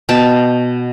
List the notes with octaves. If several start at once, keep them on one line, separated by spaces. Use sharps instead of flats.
B2 G5 A5